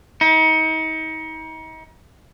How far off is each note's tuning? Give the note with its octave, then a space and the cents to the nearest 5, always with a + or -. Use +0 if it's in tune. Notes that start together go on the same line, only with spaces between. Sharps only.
D#4 +35